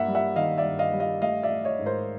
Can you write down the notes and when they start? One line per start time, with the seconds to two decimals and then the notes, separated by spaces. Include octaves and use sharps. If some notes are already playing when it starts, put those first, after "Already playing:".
Already playing: G2 A#3 E5 F#5
0.08 G3
0.15 E5 F#5
0.36 D#3 D#5 F5
0.58 D5 E5
0.65 G2
0.79 D#5 F5
0.93 G3
1.00 D#5 F5
1.22 A3 D#5 F5
1.43 D5 E5
1.50 A3
1.64 C#5 D#5
1.79 G#2
1.86 A#4 C5